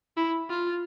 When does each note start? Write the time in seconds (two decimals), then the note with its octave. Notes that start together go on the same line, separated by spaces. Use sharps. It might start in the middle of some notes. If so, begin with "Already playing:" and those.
0.17 E4
0.50 F4